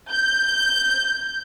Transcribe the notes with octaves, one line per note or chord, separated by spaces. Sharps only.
G6